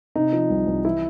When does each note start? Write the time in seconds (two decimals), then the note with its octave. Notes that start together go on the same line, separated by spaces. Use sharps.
0.16 C3 D#4
0.33 F3
0.50 C2
0.67 C2
0.85 E3 E4